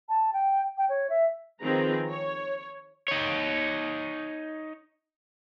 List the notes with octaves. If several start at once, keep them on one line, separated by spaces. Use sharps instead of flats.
A5
G5
G5
C#5
E5
D#3 F3 C4 G#4 B4 A#5
C#5
D#4 C#5